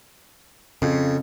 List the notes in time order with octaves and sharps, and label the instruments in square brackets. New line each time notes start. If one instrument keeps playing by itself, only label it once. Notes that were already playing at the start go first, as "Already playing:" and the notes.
[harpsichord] F2 [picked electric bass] C#3